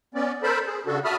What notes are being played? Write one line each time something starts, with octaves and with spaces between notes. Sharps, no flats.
B3 C#4 D5
A4 A#4 C5 A5 B5
G#4
C#3 D4 F#4 A4
F#4 E5 A5 B5 D#6 F6